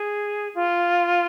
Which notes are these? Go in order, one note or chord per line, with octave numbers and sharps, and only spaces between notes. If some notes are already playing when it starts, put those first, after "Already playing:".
Already playing: G#4
F4